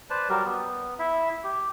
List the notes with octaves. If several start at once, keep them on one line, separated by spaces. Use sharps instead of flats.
B4 C5 D5 A5
F#3 G3 G4 A#4
B3
E4 E5
G4